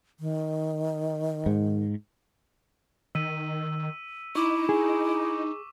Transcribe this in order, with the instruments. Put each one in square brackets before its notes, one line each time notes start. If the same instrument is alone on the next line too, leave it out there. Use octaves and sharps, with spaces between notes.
[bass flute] D#3
[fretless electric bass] G#2
[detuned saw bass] D#3 [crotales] E6 B6 D#7
[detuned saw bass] D#4 [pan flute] E4 [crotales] C#6 D6
[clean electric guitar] G#4